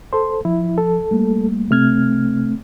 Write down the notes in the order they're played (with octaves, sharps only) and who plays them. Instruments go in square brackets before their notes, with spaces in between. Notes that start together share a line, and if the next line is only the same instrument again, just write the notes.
[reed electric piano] A4 C5 [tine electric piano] C6
[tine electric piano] F3 [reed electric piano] E4
[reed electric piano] A4
[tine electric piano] G3 A3 A#3
[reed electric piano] C3 F6 G#6 [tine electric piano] A3 C4